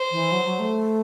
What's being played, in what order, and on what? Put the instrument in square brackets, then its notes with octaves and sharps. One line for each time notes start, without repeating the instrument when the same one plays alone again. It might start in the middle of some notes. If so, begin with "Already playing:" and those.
Already playing: [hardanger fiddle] C5
[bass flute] E3
F#3
F#3
A3